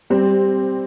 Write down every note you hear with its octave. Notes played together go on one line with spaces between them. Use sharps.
G3 C4